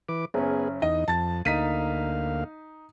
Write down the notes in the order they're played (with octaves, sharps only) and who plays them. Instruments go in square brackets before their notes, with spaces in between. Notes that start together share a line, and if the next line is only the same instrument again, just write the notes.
[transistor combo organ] E3 B4 D6
[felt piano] F#1 C#4 [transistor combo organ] B3 G#4
[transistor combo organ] E2 D#4 [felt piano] D#5
[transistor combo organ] F2 [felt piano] A5 A6
[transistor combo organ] D2 A#3 F5 [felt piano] D#4 B6 D#7